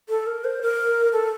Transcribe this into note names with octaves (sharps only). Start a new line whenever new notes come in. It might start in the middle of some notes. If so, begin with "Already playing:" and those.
A4
A#4
C5
A#4
A4